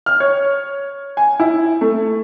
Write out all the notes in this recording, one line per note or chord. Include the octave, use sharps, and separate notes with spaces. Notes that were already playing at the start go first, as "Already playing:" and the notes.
F6
C#5
G#5
E4
A3